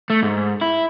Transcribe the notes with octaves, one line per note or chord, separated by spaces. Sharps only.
A3
G#2
E4